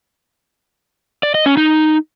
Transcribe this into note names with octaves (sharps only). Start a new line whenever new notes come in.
D5
D#5
C#4
D#4